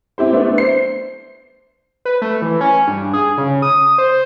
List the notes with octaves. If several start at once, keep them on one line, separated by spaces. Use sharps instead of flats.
C4 E4 G4 C5
A3 B3 D4
C5 C7
B4
A3
E3
C#4
G2
G#4
C#3
D#6
C5